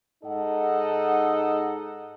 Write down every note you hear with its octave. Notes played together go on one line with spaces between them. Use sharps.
G#2 D#4 A4 D#5 F#5